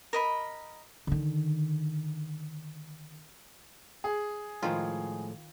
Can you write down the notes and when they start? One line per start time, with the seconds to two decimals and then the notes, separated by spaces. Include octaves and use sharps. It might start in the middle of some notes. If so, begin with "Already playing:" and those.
0.13 A#4 D#5 B5
1.07 D3 D#3
4.04 G#4
4.63 A2 D#3 F3 G#3 F4